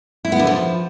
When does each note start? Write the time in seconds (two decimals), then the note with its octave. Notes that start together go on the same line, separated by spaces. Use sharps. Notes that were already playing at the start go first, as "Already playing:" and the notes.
0.25 E4
0.32 B3
0.39 D3
0.47 F3